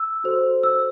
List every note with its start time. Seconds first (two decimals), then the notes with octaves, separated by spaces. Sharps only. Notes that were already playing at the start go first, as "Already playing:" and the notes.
Already playing: E6
0.24 F#4 A4 C5
0.63 E6